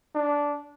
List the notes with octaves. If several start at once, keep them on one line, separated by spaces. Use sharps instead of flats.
D4